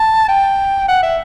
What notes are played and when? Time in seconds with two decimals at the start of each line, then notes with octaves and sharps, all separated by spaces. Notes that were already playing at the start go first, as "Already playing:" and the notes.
Already playing: A5
0.28 G5
0.88 F#5
1.03 E5